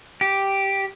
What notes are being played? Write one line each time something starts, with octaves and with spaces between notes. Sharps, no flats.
G4